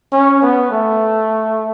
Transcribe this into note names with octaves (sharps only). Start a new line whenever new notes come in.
C#4
B3
A3